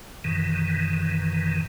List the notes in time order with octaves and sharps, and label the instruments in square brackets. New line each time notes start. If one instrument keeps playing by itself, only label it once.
[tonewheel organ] F#2 B2 D#3 E3